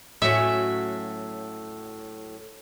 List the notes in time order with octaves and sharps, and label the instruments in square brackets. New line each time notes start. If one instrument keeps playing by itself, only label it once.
[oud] A2 F#3 C#4 [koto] E5